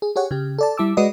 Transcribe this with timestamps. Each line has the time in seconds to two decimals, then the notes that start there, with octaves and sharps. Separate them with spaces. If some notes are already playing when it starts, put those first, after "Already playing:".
0.02 G#4
0.16 G4 G#4 C#5 F#5
0.31 C#3 G4
0.58 A4 D5 A5
0.77 G3 E4 A5 D6 E6
0.97 G#3 F#4 B4 D5 D#5